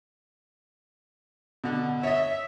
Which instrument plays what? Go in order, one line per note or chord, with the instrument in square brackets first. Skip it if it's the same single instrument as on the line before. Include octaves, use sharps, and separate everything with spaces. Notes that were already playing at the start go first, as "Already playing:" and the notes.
[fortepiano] B2 D3
[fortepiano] C#5 D#5 [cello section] E5